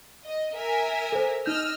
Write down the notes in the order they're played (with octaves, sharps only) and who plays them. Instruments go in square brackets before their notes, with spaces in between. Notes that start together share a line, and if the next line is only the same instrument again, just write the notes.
[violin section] D#5
A#4 E5 G#5
[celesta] A4 C5
[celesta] D#4 G6 [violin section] D#5 E6 F6